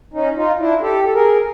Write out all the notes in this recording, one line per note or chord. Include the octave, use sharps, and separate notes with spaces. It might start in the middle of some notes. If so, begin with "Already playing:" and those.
C#4 D#4
D#4 F4
D4 E4
G4 A4
A4
G#4 A#4